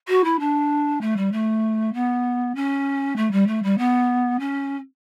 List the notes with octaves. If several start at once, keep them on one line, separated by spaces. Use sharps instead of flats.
F#4
E4
D4
A3
G3
A3
B3
C#4
A3
G3
A3
G3
B3
C#4